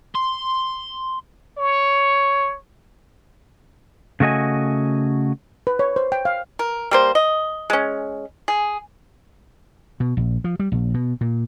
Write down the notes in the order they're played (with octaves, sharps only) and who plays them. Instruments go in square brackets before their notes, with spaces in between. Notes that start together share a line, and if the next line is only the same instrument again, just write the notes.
[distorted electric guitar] C6
[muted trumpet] C#5
[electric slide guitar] C#3 A3 F#4 D#5 G#5
[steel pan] B4
C#5
C5
G5
F5
[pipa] A#4
G3 A#3 C5
D#5
G#3 C#4
G#4
[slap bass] B2
A#1
F3
G3
A#1
B2
A#2